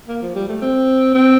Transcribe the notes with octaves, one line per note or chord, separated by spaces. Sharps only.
A#3
F3
G3
A3
C4
C4